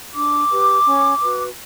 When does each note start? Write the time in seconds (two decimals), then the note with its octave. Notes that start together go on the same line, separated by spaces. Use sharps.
0.14 D4 D6
0.50 G4 B4
0.85 C#4
1.21 F#4 B4